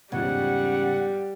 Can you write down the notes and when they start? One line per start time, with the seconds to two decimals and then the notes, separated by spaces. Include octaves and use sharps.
0.12 E2 G#2 C#3 F3 G3 F#5